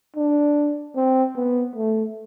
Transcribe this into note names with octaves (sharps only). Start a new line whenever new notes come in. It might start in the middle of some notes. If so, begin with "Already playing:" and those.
D4
C4
B3
A3